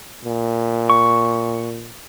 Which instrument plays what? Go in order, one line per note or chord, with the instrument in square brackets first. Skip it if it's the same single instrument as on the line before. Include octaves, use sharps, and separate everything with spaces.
[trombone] A#2
[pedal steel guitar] C#6